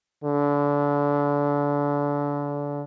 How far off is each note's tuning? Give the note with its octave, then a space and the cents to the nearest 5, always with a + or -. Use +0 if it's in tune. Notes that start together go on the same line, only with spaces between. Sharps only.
D3 -30